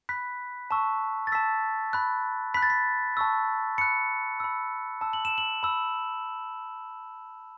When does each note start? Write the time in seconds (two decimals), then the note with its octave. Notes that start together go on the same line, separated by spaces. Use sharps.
0.09 B5 F#6 B6
0.71 A5 C#6 E6
1.27 A6
1.32 A5 E6 B6
1.93 B5 F#6
2.54 B5 F#6 B6
2.62 A6
2.70 B6
3.17 A5 C#6 E6
3.78 B5 F#6 C#7
4.40 B5 E6
5.01 A5 E6
5.13 F#7
5.25 E7
5.38 F#7
5.63 B5 E6